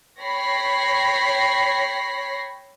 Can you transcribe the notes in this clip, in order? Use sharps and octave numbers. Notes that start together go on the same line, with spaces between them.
C#5 G5 B5 A#6 C7